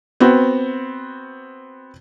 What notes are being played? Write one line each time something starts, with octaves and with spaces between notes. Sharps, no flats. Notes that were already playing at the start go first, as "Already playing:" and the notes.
B3 C4 F#4